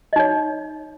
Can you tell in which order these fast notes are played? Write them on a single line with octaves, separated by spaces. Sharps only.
D#5 D#4 C#5